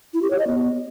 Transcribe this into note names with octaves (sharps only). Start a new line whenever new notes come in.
E4
G4
C#5
D#5
B3